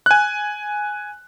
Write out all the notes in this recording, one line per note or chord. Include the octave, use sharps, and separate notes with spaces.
G#5 F#6